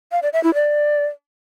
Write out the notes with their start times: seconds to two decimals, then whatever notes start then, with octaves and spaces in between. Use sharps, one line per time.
0.12 F5
0.22 D5
0.33 E5
0.44 E4
0.54 D5